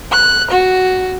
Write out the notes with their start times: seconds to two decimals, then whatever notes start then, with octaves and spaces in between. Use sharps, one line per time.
0.11 F#6
0.49 F#4